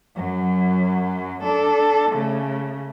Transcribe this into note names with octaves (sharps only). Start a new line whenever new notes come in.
F#2 F#3
D4 A4
C#3 A3